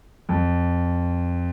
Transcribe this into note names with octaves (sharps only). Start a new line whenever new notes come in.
F2